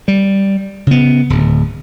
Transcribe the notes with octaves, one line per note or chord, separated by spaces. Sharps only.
G3
C#3 B3
D1